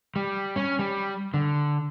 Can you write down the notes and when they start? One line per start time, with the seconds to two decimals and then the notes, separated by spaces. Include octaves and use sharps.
0.16 G3
0.56 C#4
0.79 G3
1.34 D3